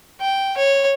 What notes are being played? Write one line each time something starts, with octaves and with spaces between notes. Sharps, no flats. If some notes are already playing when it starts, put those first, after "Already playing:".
G5
C#5